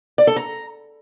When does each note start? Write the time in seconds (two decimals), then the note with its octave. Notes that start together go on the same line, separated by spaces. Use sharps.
0.18 D5
0.27 A4
0.36 A#5